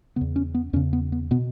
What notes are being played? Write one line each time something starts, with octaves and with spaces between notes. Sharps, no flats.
E2 C#3 B3
C#4
B3
E2 C#3 C#4
B3
B3
B2 B3